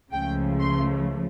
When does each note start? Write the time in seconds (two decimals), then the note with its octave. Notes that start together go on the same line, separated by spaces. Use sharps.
0.12 C#2 C#3 F3 A3 G5
0.59 C6